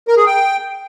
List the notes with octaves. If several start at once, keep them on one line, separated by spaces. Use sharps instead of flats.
A#4
G#4
G5